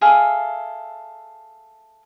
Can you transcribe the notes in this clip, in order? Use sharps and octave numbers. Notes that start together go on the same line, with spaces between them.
G#4 A4 E5 F5